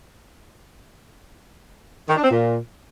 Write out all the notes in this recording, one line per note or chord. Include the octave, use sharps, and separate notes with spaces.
D#3
D4
C4
A#2